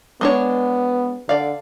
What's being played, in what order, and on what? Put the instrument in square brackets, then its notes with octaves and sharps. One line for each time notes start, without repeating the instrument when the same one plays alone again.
[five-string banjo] G#3 D4 C#5 [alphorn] B3
[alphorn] D3 [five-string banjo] D5 F5